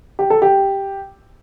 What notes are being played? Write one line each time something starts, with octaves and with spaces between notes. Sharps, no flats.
G4
A4
G4